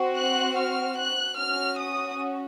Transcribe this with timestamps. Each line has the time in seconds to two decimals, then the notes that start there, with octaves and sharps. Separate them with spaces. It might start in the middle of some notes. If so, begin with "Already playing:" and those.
Already playing: C4 F#4
0.17 F#6
0.57 F6
0.97 F#6
1.37 C#4 F#4 F6
1.79 D#6